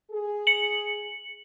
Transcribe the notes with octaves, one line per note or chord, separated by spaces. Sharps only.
G#4
C#7 F#7